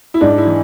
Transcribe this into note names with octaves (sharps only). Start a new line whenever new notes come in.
E4
G#2 D4
E4
E3